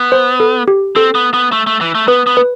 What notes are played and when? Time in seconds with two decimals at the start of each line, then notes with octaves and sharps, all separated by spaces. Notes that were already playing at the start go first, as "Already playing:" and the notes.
Already playing: B3
0.12 C5
0.40 A4
0.68 G4
0.96 C4 A4
1.15 B3
1.34 B3
1.52 A3
1.67 A3
1.81 E3
1.95 A3
2.08 B3 B4
2.27 B3
2.37 B4